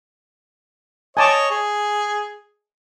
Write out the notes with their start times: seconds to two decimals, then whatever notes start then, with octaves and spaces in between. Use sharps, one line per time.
1.17 C#5 D#5 G#5 A5 D6
1.51 G#4